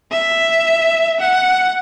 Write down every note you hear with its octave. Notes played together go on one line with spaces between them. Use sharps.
E5
F#5